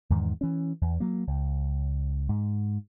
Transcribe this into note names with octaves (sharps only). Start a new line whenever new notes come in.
E2 G#2 D#3
E3 C#4
E2
F#3 A#3
C#2
G#2